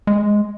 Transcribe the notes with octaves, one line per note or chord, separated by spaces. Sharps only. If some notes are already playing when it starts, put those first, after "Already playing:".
G#3